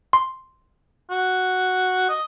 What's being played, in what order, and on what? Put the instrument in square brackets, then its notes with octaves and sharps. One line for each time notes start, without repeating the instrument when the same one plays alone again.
[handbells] C6
[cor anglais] F#4
D#5